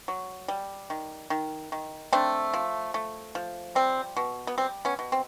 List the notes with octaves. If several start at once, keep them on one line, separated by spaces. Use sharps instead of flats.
F#3
G3
D#3
D#3
D#3
A3 C4 D4
F3
A3
F3
G3 C4
B2
B3
G3 C4
B3 C#4
B2
C4